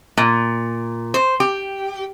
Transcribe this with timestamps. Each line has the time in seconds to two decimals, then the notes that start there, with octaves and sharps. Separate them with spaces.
0.17 A#2
1.14 C5
1.40 G4